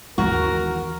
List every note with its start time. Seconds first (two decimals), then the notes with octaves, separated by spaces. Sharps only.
0.18 D#2 E3 F#4 A#4